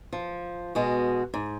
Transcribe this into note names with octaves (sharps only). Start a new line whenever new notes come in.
F3
B2 G#3 F#4
G#2